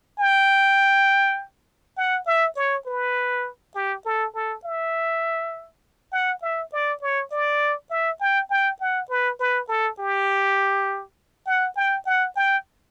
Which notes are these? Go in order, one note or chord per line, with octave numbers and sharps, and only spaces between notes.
G5
F#5
E5
C#5
B4
G4
A4
A4
E5
F#5
E5
D5
C#5
D5
E5
G5
G5
F#5
B4
B4
A4
G4
F#5
G5
F#5
G5